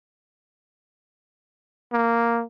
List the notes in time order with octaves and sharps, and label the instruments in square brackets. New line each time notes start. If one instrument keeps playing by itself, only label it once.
[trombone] A#3